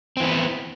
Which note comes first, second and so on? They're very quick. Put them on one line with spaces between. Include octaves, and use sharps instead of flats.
C4 E3 B3